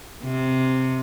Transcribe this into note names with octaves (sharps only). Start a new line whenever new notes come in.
C3